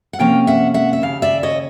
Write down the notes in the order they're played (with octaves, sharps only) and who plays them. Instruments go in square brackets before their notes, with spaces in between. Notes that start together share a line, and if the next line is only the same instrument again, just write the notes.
[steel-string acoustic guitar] F#5
C3 F3 A#3 C#4 F5 G5
E5 F#5
E5 F#5
E5
D#2 C#3 F5
D5 E5
C#5 D#5